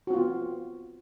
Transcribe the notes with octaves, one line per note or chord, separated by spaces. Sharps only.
B3 C4 F4 F#4